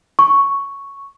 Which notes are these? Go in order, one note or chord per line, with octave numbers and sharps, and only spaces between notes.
C#6